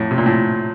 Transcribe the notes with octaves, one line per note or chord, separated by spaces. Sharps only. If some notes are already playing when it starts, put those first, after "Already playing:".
Already playing: F2 A2
C3
A#2
A2